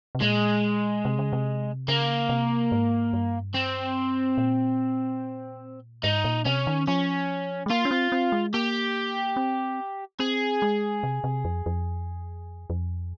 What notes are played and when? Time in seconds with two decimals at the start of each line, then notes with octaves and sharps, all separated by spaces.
0.15 C3
0.22 A#2 G#3
1.05 C3
1.19 C#3
1.33 C3
1.88 C#3 A#3
2.29 C3
2.72 G#2
3.13 G2
3.55 C4
4.38 A#2
6.04 G#2 D#4
6.24 A#2
6.46 C3 C#4
6.67 D#3
6.87 F3 C#4
7.66 G#3
7.70 A#3 F4
7.85 C#4
7.91 C4
8.12 C4
8.32 G#3
8.54 A#3 G4
9.36 C4
10.19 C4 G#4
10.62 G#3
11.03 C3
11.24 C3
11.45 F2
11.66 F2
12.70 F2